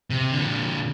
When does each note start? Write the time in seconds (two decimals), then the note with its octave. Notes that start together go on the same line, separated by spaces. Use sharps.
0.10 C3
0.31 A#2 D3